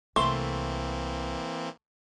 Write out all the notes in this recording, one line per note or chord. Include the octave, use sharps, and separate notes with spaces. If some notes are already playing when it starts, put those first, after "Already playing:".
C2 E3 A3 A#3 C4 C6